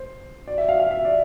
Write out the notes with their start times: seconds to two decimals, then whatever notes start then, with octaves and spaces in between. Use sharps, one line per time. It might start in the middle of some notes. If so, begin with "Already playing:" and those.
Already playing: C5
0.48 D5
0.58 E5
0.69 F5
0.80 F5
0.91 E5
1.05 D5